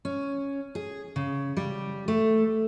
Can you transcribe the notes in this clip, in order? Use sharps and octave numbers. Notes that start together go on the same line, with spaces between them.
C#4
G#4
C#3
G3
A3